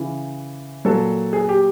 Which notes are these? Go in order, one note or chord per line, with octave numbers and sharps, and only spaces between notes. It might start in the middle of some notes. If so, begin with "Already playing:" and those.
Already playing: C#3 E3
A#2 F#3 A4
G#4
G4